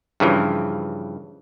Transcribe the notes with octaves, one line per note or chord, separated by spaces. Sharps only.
G2 C#3 E3 F3